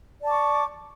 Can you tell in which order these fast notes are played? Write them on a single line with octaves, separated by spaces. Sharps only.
D5 A5 D6 C#6